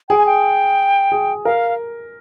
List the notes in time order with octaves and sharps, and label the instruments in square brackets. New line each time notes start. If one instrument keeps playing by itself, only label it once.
[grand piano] G#4 [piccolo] G5
[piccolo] G#5
G5
[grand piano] G#4
[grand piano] A#4 [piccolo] F5